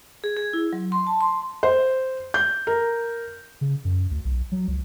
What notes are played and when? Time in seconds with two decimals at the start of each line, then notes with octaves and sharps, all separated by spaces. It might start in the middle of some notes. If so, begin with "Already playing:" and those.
0.24 G#4
0.37 G#4
0.53 E4
0.73 F#3
0.92 C6
1.07 A5
1.21 C6
1.63 C5
2.34 G6
2.67 A#4
3.61 C#3
3.85 F#2
4.11 D2
4.25 B1
4.52 F#3
4.68 C#2